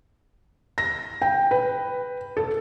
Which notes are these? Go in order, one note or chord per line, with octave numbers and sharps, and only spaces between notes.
A#6
G5
B4
A4